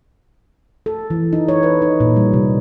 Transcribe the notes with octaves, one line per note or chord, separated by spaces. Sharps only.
A4
E3
D#4
C#5
B4
D#4
A#2
G3
C3